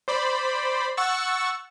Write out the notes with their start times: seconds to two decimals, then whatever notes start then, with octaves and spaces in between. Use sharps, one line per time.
0.08 C5 D5 B5
0.97 F#5 C#6 E6 A6